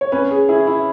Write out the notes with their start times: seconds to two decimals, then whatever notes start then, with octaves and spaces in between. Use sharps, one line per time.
0.01 C#5
0.12 C#4 B4
0.31 G#4
0.49 E4 G#4
0.67 E4